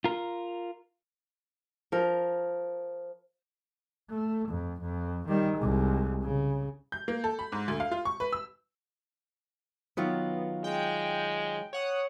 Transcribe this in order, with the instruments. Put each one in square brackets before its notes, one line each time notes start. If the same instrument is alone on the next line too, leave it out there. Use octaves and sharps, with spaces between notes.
[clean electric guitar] F4 A#4
[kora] F3 A#4
[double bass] A3
F2
F2
D#3 G3
C2 G#3
C#3
[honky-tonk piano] G6
A#3
A4
B5
G#2
D2
F5
F4
C#6
B4
E6
[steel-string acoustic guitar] D#3 F#3 F4 [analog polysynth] B3
[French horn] G#3 [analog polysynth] G5
[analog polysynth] C#5 F#5 D#6